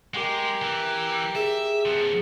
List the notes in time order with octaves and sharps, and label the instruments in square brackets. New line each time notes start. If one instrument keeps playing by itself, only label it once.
[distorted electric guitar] G#3 [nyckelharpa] G4 A#4
[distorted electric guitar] E3
[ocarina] G#4 [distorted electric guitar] E5
[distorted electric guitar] F3 B3